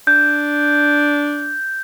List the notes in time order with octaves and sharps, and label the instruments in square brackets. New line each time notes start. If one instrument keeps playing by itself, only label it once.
[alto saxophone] D4 [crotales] G6